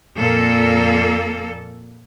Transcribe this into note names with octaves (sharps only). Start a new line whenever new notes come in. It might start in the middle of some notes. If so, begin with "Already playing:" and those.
F2 A#2 A#3 A4